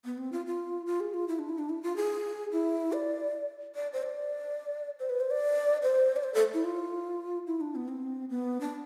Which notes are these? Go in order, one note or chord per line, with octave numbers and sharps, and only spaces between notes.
B3
C4
F4
F4
F4
G#4
F4
E4
D4
E4
D4
E4
F4
G#4
E4
D5
D5
C5
D5
C5
B4
C5
D5
C5
D5
C5
A4
E4
F4
E4
D4
B3
C4
B3
D4